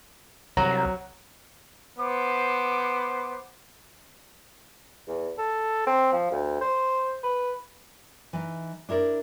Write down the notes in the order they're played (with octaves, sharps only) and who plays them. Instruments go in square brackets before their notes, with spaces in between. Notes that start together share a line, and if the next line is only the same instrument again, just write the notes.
[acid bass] C2 [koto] F#3 [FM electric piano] A#5
[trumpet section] B3 C5 D6
[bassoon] E2
A4
C4
F3
D2
C5
B4
[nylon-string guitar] E3 D#4
D4 E4 A#4 C#5 D5